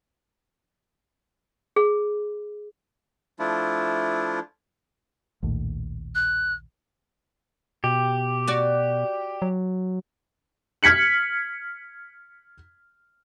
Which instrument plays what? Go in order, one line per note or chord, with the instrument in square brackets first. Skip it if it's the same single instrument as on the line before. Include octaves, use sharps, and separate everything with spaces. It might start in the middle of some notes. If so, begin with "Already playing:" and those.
[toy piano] G#4
[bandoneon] F3 A3 D4 E4 F4
[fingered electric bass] A#1 D#2 A2
[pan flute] F#6
[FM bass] B2 [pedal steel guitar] G4
[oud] F#4 D5
[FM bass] F#3
[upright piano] F6 G#6 B6 C#7 F#7